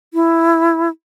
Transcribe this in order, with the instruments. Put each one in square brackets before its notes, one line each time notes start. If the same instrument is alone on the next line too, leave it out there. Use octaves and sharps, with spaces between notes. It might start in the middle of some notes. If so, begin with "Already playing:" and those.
[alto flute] E4